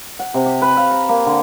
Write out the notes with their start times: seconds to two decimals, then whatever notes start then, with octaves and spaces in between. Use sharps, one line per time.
0.19 F#5
0.34 C3
0.46 G4
0.62 B4
0.77 F5
0.91 A#5
1.09 A#3
1.26 D3